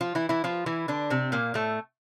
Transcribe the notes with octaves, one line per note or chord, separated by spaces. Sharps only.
F3 F4
E3 E4
E3 E4
F3 F4
E3 E4
D3 D4
C3 C4
A#2 A#3
A2 A3